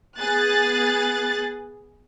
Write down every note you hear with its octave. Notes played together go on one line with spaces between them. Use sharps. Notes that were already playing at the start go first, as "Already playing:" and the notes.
B3 G#4 F#6 A6